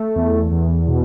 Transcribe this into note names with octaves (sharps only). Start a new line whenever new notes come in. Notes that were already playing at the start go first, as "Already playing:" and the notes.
Already playing: A3
E2
E2
B2